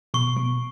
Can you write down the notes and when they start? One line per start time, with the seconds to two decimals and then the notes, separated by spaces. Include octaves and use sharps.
0.14 B2 C#6
0.37 B2